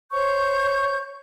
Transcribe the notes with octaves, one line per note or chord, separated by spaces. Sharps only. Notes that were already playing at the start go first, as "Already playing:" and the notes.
C5 C#5 C#6 G6